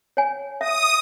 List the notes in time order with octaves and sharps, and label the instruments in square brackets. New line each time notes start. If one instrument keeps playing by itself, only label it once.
[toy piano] C#5 G#5
[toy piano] E5 [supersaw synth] D#6